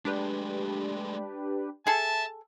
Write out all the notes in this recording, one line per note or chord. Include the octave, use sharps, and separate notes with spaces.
G#3 A3 D4 G4 B4
G#4 A4 E5 A5